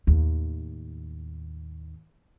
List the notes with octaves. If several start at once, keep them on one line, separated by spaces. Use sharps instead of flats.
D#2 A2